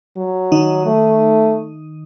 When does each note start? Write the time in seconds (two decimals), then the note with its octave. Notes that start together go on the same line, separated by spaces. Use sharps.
0.17 F#3
0.52 D#3 D#4
0.86 A3